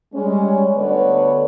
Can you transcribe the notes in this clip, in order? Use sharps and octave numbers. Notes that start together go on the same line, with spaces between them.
G3 G#3 C#4
D2 D3 B3 B4 C#5 D5